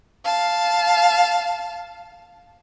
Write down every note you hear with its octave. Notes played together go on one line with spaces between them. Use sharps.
F5 A5